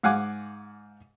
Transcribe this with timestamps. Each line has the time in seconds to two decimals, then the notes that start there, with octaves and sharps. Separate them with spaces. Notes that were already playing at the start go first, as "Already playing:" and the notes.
0.03 G#2 F5 F#5 G#5 D6